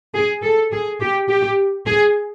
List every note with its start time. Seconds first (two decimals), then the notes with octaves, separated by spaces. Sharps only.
0.14 G#4
0.43 A4
0.72 G#4
1.00 G4
1.29 G4
1.86 G#4